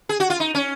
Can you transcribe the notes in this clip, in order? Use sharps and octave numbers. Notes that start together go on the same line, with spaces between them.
G#4
F#4
F4
D#4
C#4